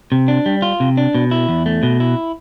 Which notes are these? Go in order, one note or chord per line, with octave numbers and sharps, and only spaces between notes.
C3
D4
G3
F4
C3
D4
B2
E4
E2
A3
B2
E4